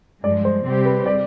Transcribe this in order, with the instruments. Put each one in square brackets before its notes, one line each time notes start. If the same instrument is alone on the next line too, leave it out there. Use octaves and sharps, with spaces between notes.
[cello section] G2 F3 G#3 [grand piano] D5
[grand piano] C5
[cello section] C3 G3 C4 G4
[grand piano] B4
D5